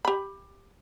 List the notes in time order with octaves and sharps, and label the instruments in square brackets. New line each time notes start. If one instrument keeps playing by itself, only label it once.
[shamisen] G4 B5